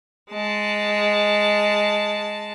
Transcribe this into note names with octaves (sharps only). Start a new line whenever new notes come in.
G#3 A5